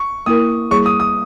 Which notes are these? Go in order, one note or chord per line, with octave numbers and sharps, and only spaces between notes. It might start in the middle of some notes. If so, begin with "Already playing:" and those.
Already playing: C#6
A#3 E4 A#4 D#6
G3 A#3 E4 G#4 C#5 C#6
D#6
D#6